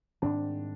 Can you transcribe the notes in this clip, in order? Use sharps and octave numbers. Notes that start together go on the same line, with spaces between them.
G#2 D#3 G3 C4 D4